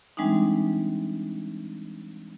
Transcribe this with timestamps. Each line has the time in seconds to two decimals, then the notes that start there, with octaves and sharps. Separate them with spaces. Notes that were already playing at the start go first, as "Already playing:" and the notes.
0.17 E3 G3 G#3 C4 D4 D#4